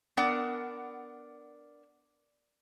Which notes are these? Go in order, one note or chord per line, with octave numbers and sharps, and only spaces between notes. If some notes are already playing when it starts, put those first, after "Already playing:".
B3 D4 A#4 D5 F#5